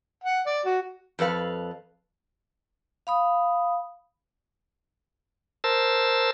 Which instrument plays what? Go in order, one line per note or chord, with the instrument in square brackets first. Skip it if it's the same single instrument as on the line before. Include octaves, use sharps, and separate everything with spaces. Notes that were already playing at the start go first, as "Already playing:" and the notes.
[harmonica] F#5
D5
F#4
[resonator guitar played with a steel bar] F2 A4 B4 F5
[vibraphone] F5 B5 D#6
[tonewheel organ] A#4 C5 A5 E6